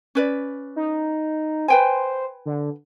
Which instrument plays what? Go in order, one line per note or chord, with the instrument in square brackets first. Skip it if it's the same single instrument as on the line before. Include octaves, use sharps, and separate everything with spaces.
[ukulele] C#4 B4 D5
[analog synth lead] D#4
[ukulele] B4 G5 G#5 [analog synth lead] C5
[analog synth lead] D3